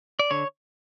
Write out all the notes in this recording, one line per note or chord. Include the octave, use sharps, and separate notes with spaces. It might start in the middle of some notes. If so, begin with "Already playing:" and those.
D5
D3 C#5